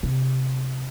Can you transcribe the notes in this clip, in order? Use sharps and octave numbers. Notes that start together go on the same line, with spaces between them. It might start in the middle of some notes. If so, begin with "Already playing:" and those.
C3